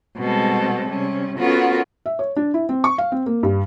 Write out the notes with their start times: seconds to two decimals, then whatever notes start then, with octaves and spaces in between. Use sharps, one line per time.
0.18 B2 G3 G#3 C4 A4
0.87 C3 G3 C#4
1.38 B3 C#4 F4 F#4 A4 A#4
2.06 E5
2.19 C#5
2.36 D4
2.54 E4
2.69 C4
2.84 C#6
2.98 F5
3.12 C4
3.26 A#3
3.43 G2